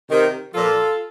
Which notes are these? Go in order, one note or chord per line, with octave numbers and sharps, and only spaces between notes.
C3 D#3
A#2 F3 F4 A4